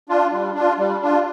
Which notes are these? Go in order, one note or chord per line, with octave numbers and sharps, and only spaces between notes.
D4 F4
G3
D4 F4
G3
D4 F4